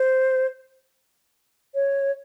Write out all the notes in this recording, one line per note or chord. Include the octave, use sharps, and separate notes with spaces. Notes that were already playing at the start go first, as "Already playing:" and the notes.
Already playing: C5
C#5